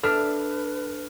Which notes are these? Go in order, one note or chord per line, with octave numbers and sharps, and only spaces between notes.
D4 A4 B4 E5 F6